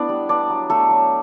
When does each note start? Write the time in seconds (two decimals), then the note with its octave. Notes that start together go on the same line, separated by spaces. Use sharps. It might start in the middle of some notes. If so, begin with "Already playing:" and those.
Already playing: A3 B3 D4 E4 D5
0.09 G3
0.29 B3 D4 D5
0.50 F#3
0.70 F#3 A3 A4
0.90 F#3